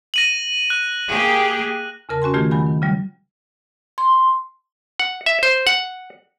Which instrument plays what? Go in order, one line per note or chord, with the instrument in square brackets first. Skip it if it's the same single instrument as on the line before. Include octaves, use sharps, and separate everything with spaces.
[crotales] A#6 D#7 F#7
F#6
[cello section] A#3 G4 G#4
[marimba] E2 C#3 A#4 A5
C#4 F#4 G#5 C6
D#3 A3 F4 G4 G#6
D#3 F#3 G#5 B5
D#3
C#3 F#3 G3
[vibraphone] C6
[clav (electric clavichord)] F#5
E5
C5
F#5